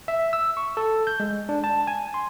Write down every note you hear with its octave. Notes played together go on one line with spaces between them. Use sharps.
E5
E6
C#6
A4
G6
G#3
D4
A5
G#5
C6